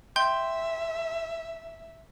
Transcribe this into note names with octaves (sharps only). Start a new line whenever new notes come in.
E5 G5 C6 G6